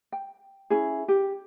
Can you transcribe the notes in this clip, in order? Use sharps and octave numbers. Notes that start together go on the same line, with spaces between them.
G5
C#4 E4 G#4
G4